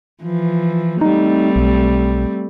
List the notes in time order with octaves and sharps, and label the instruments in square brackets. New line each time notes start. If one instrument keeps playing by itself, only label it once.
[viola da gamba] E3 F3
[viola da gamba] G3 A3 C4 [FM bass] D#4
[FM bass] B1